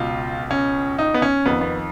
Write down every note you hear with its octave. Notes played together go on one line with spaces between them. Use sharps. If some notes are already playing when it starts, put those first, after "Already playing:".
Already playing: C#2 B2 F4
C#4
D#4
B3
C#4
F2 D#3 B3
B3